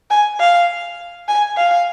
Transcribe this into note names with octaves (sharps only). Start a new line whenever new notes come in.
G#5
F5
G#5
F5